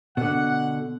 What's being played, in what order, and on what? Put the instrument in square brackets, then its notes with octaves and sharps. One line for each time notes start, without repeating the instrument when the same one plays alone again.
[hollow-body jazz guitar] B2 D3 [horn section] F#5